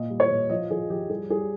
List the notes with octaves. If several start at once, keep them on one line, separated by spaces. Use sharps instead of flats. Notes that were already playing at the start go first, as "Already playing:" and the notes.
Already playing: A#2 D#5
G3
C#5
A#2
F3 D#5
F3 G#4
F3 G4
G3 G#4
G3 G#4